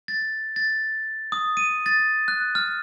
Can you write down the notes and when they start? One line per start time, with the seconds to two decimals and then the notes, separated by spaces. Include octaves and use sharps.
0.08 A6
0.56 A6
1.32 D#6
1.57 D#7
1.86 A6
2.28 F#6
2.55 F6